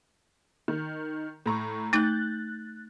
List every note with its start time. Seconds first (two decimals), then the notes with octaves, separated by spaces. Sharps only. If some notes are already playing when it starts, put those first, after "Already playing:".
0.68 D#3
1.46 A2 A#5 C#6
1.93 A3 D#4 F#6 G6 A6